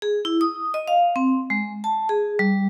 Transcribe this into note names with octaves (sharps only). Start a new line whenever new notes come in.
G#4
E4
D#6
D#5
F5
C4
G#3
A5
G#4
G3